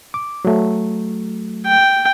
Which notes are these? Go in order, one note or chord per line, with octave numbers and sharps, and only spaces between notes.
D6
F#3 A3
G5